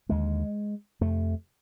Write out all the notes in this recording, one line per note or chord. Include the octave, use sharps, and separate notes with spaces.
D#2 D3 G#3
F2 C3 A3